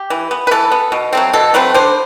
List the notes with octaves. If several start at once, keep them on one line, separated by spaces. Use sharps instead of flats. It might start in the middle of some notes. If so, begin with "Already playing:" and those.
Already playing: G4
E3
B3
B4
E3 A4
B3
B2
F#3 A3 C4
B2 A4
F#3 A3 C4 B4
D3 C5